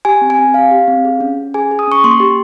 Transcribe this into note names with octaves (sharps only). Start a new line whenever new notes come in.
G4 G#5
C4
G#5
C4
G4 F5
G4
C4
G#4
C#4
C#4
G#4 G#5
G#4
D#6
C#4 C#6
A#3 C6
G4